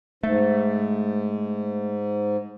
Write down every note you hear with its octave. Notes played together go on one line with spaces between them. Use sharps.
G#2 A3